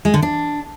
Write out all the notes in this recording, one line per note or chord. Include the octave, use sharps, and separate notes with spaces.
G#3
D3
D4